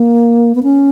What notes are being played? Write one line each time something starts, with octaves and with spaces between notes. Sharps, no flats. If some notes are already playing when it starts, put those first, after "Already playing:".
Already playing: A#3
B3
C#4